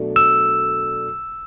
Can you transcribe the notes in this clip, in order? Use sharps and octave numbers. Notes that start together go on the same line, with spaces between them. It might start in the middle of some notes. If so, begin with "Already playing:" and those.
Already playing: B2 F#3 A3 D4
E6